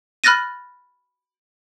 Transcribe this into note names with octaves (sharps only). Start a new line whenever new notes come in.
B5 F6 F#6 A6 A#6 D#7